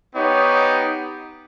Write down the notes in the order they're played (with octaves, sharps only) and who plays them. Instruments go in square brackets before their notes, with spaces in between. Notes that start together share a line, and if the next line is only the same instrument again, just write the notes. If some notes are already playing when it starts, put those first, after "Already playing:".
[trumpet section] B3 D#4 G4 C#5